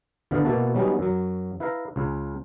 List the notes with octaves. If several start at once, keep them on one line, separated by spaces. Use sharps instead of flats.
D2 A2 D3 B3 F5 F#5
B2 A#3 E4 F#4 A5
F#3 G3 B3 C#4 D#4
F#2 F#3
E4 B4 E5 F5 A#5
C#2 C#3